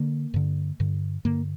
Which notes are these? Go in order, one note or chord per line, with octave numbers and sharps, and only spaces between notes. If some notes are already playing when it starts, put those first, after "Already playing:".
Already playing: D3 A#3
G2 D3
G2 D3
G2 D3 A#3